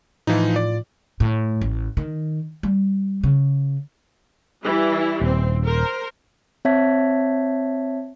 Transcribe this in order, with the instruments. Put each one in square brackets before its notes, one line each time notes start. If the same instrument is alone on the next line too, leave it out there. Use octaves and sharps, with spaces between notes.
[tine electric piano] A2 F4 [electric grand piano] E3 F3 D#4
[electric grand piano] D5
[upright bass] A2
A1
D#3
G3
C#3
[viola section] E3 G3 E4
[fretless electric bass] D#1 [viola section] C4
[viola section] A#4 C5
[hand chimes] C4 C#5 E5 A5 G#6 B6